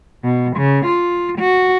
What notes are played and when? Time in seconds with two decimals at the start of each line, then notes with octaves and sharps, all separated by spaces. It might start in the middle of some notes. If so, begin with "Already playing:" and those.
0.24 B2
0.57 C#3
0.86 F4
1.39 F#4